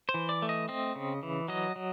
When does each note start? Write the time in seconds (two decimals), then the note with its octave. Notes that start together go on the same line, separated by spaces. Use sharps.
0.09 C5
0.14 E3
0.29 D5
0.42 A3
0.49 D#5
0.69 C4 D#5
0.96 C#3
1.23 E3
1.48 F#3 D#5
1.76 F#3